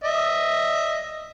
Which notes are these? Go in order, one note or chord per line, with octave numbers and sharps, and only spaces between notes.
D#5 E5